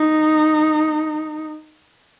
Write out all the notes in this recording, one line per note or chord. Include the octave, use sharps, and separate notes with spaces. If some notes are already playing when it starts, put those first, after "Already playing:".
Already playing: D#4